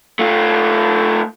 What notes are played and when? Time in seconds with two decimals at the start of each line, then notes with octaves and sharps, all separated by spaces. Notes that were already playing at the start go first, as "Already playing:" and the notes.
0.19 A3 F4